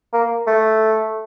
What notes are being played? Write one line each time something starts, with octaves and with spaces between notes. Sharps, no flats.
A#3
A3